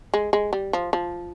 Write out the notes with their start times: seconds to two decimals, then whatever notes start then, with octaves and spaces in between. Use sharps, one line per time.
0.14 G#3
0.33 G#3
0.53 G3
0.73 F3
0.93 F3